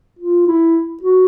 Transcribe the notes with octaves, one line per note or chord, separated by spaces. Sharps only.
F4
E4
F#4